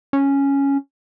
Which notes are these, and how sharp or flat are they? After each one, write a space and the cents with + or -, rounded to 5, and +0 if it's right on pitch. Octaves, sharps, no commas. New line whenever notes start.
C#4 +0